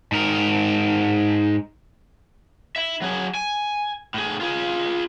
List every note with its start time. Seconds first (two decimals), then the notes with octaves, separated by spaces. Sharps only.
0.12 G#2 A#4
2.76 E4 E5
3.02 F#3 G#4
3.35 G#5
4.14 A2 G#4
4.41 F4 G#4